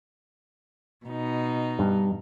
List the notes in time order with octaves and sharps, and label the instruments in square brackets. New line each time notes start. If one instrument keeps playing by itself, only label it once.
[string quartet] B2 D#4
[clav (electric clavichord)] G2